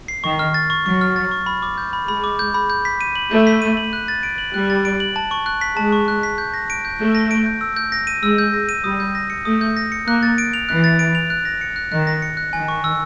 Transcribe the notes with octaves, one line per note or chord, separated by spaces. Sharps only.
C7
D#3 C#6
F6
A6
C#6
F#3 C#6
F6
A6
C#6
B5
D6
G6
B5
G#3 B5
D6
G6
B5
G6
B6
D#7
F#7
A3 G6
B6
D#7
F#7
F#6
A6
D7
F#7
G3 F#6
A6
D7
F#7
A5
C#6
F#6
B6
G#3 A5
C#6
F#6
B6
G6
A#6
D7
G6
A3 G6
A#6
D7
G6
E6
G6
A#6
D#7
G#3 E6
G6
A#6
D#7
G3 D#6
G6
A#6
C#7
A3 D#6
G6
A#6
C#7
A#3 F#6
A6
D7
F7
E3 F#6
A6
D7
F7
F#6
A#6
C#7
F#6
D#3 F#6
A#6
C#7
F#6
D#3 G#5
C#6
E6